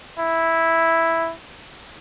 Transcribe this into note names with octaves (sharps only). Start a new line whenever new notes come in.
E4